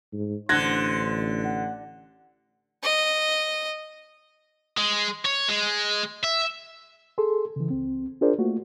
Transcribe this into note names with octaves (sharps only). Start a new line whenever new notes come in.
G#2
A1 D3 C5 F#6 G#6 A#6
F#5
D#5
G#3
C#5
G#3
E5
G#4 A4 C6
C#3 E3
C#2 C4
D4 F4 G#4 A#4 C5 D5
A3 A#3 F4 F#4